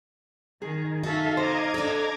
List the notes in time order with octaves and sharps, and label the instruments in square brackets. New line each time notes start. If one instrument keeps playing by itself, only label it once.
[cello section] D#3 [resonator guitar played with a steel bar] G#4
[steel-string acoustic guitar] D#4 [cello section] F#4 A4 E5 [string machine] F5
[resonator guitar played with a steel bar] C5 [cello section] D#5 [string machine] A#5 D6 G#6
[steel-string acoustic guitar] D4 A4